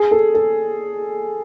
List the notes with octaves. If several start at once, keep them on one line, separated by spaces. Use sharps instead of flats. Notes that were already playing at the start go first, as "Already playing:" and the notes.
Already playing: G#4
A4
A4